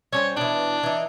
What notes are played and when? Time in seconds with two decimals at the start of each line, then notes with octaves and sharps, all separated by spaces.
0.13 G3 C#4 C5 C#5
0.37 B2 E3 D4
0.83 E3 D#4